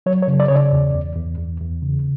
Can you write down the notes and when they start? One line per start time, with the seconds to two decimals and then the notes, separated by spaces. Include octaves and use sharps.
0.06 F#3 C#5
0.23 C#5
0.28 C#3
0.40 D5
0.48 C#3 C#5
0.56 D5
0.72 E2
0.94 E2
1.16 E2
1.38 E2
1.60 E2
1.82 C#3